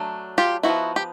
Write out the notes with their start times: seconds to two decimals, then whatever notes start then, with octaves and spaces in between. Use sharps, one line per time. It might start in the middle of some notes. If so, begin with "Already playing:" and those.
Already playing: F#3 A3 D4
0.38 F4 G4
0.63 G#3 B3 D#4 E4 F#4
0.69 F3
0.96 G4